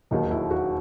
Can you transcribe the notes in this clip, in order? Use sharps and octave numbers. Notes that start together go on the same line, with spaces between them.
E1 D#2 D#3 F#3 D#4
E4
F#4